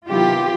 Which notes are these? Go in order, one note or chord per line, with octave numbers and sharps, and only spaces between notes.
C3 D#3 F#3 B3 E4 F4 G4